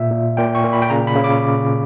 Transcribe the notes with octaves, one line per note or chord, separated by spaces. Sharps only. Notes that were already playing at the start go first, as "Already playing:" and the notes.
Already playing: A#2 E5
A#2
A#2 G5
C#6
A#2
B5
G5
C#3 A#5
B5
C#3
D6